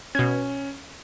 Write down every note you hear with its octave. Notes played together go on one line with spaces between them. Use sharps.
B2 C#4 G#6